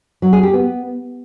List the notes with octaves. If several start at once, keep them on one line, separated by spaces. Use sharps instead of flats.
F#3
G#4
G4
B3